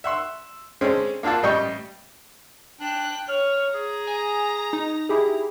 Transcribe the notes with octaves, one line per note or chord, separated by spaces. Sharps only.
E5 F#5 C6 E6
D3 G#3 C4 C#4
A#3 D4 F4 F#5 A5
A1 G3 D#5 G5 C#6
D4 G5 F#6
C#5 F6
G#4 A#5
G#5
D#4
E4 G4 G#4